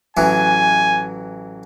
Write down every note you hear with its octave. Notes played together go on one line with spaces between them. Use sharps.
A1 E3 F#3 G#5